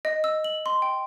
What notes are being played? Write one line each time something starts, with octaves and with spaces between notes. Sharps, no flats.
D#5
E6
F#7
C6
G5